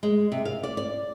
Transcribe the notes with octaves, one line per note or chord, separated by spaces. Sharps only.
G#3
C3
F5
D5
D5